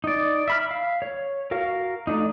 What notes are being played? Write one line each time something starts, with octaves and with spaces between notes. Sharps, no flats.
D#4 D5
E5 B5 F6
F5
C#5
F#4 A#4 F5
A3 D4 D#4